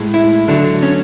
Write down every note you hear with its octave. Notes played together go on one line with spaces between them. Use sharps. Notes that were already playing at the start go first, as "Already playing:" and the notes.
Already playing: A2 G#3
E4
D3 F#3 A3 D4
C#4